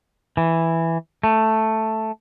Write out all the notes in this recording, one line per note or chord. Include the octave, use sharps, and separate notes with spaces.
E3
A3